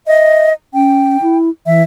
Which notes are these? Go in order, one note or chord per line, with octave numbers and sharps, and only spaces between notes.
D#5 E5
C#4 G5
E4
E3 E5